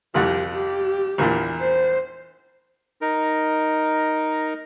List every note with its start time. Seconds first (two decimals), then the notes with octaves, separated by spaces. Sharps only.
0.14 C2 F2 G4 F#5
0.54 G4
1.18 A#1 E2 A#2
1.60 C5
3.01 D#4 A#4